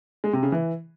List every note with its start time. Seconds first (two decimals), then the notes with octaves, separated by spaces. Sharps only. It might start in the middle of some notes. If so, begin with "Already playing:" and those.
0.24 G#3
0.33 C3
0.43 C#3
0.52 E3